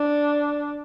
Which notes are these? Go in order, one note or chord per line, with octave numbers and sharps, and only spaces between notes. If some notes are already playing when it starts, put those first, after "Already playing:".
Already playing: D4